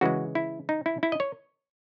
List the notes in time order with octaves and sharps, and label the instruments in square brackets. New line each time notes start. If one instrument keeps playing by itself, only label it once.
[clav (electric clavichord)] C#3 E3 G#3 F#4
E4
D#4
E4
E4
D#5
C#5